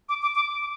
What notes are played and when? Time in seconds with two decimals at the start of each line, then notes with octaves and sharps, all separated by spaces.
0.09 D6
0.22 D6
0.35 D6